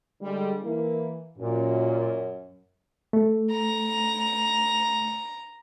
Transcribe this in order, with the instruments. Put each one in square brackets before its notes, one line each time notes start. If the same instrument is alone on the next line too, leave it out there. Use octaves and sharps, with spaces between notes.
[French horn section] D3 G3 G#3
E3 A#3 E4
[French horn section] F#2 [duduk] A#2
[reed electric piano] A3
[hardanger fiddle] A#5